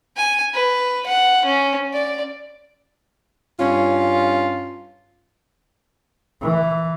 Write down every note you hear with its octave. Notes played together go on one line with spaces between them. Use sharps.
G#5
B4
F#5
C#4
D5
G2 C#4 F4
E3